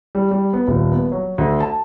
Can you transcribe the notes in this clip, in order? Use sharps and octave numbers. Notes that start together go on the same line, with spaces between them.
G3
G3
B3
D#1
B3
F#3
D2
A5